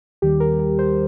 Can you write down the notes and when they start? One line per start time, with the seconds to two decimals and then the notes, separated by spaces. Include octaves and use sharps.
0.22 D#2 D#3 G3 G4
0.40 A#4
0.59 A#4
0.79 C5